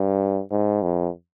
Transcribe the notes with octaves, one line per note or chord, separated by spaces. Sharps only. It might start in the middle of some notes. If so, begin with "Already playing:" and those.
Already playing: G2
G#2
F2